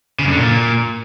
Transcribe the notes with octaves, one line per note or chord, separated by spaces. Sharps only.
C#3
F#2
D3
A#2